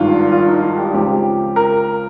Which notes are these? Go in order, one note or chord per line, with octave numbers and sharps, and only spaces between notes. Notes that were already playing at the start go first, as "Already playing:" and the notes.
Already playing: G#1 G2 D#3 F4
F4
D#4
F4
G4
C#2 C#3 F3 C4 G4
A#4